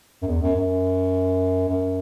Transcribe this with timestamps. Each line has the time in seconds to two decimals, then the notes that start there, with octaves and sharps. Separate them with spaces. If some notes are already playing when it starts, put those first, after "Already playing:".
0.22 F#2
0.27 E2
0.42 F#2
0.56 F#2
1.68 F#2